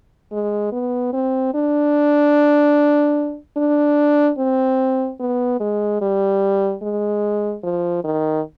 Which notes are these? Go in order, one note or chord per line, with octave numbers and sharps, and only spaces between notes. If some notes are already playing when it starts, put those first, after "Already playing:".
G#3
B3
C4
D4
D4
C4
B3
G#3
G3
G#3
F3
D#3